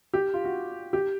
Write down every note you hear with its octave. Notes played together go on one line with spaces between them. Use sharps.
G4
F4
F#4
G4